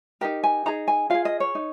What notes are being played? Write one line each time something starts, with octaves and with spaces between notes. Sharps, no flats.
D#4 G4 A#4 G5
G#5
D#4 G#4 A#5
G#5
F4 G#4 F5
D#5
C#5
D#4